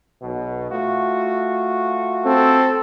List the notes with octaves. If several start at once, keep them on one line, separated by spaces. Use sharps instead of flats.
B1 B2
A3 F4 F#4
C4 A4